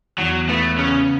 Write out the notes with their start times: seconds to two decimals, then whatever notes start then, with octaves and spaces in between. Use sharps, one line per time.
0.18 E2 F#3
0.49 A3 B3
0.78 C#3 C#4